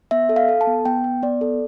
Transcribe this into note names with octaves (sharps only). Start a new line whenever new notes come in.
B3 E5
A4
F5
A4
A5
B3
B3 G5
B3
B3 D5
A4